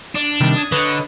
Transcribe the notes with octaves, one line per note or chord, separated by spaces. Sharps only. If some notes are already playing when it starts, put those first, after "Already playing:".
D4
C3 D#3 G3
D#6 G#6
D3 B4 C#5 D#5